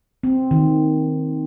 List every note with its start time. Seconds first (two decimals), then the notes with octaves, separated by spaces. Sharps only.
0.23 C4
0.51 D#3